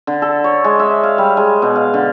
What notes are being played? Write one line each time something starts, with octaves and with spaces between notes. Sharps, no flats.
D3
A4
C#5
G#3
E5
F5
G3
G#3
B2
F5
D3